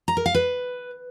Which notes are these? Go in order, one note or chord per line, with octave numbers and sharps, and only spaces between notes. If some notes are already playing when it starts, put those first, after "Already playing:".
A#5
A#4
F5
B4